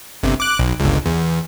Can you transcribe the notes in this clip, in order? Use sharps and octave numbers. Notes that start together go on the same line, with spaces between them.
G1 C3
D6 F#6
B1
G1 C#2
E2